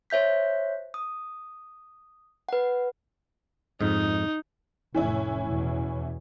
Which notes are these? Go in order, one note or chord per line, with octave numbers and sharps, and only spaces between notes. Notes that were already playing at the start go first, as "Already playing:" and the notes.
C5 C#5 E5 G6 B6
D#6
B4 F#5
F2 G#2 D#4
F1 A2 E3 C#4 E4
E2 B2